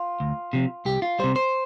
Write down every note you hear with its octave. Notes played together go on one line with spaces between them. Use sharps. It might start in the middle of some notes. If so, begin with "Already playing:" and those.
Already playing: F4
D2
C3 F3
C2 G4
F4
C3 G3 C5
C5